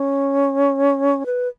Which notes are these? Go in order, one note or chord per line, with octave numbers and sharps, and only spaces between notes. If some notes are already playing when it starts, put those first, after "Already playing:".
Already playing: C#4
B4